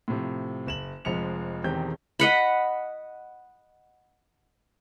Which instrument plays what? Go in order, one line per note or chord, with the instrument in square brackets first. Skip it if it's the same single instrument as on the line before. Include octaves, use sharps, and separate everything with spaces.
[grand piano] A2 C3 F3
F#1 E7 F#7
F1 F3 G#3 C#7 F7
E1 E2 D#3 C4 G4 G6
[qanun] D#5 F#5 B5